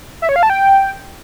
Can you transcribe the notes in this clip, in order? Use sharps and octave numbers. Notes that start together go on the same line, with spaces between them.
E5
C#5
F5
A5
G5